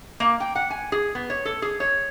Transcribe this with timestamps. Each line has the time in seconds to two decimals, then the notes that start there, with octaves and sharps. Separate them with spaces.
0.20 A#3
0.40 G5
0.55 F#5
0.70 G#5
0.92 G#4
1.15 B3
1.30 C#5
1.45 A4
1.62 G#4
1.80 C#5